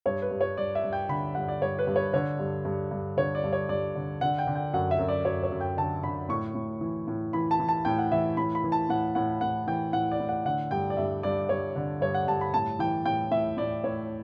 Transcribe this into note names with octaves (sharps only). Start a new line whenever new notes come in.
G2 C#5
B4
G2
C#5
G2 D5
E5
G2
G5
D3 B5
G2 F#5
D5
G2 C#5
B4
G2
C#5
D3 C#5
G2
G2
G2
D3 C#5
D5
G2
C#5
G2 D5
D3
D3 F#5
G5
D3
G5
F#2 F#5
E5
F#2
D5
F#2 C#5
C#5
F#2
G5
D3 A5
D3 B5
A2 C#6
A2
E3
A2
E3 B5
A5
E3
A5
A2 G5
F#5
E3 E5
A2 B5
B5
E3
A5
A2 F#5
A2 F#5
A2 F#5
E3 G5
A2 F#5
D5
A2
F#5
D3 F#5
G2 G5
D5
G2 E5
G2 D5
G2 C#5
D3
G2 C#5
F#5
G2 A5
B5
A2 A5
E3 G5
A2 G5
A2 E5
A2 D5
A2 C#5